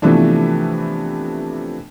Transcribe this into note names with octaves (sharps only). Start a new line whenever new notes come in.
C3 E3 F3 A3 B3 D4